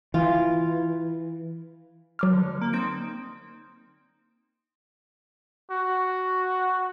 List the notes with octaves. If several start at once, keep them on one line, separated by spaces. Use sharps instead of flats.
E3 F4
F#3 D6 F6
D3
A#3
C4 D#4 D7
F#4